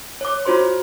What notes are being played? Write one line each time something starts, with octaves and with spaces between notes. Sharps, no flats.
C#5 D6
F4 F#4 C5 C6